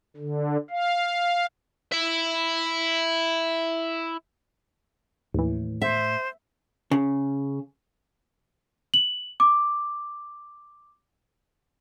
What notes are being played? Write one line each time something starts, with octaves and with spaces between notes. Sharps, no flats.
D3
F5
E4 E5
D#2 A2 E3
C5 E5
C#3
F#7
D6